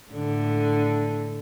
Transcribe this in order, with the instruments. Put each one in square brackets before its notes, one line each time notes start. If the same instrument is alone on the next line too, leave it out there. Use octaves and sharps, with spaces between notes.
[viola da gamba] A2 D3